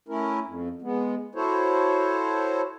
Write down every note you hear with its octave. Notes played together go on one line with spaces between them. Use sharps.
A3 C#4 E4 A#4
F2
G#3 B3
E4 F#4 A4 C5 C#5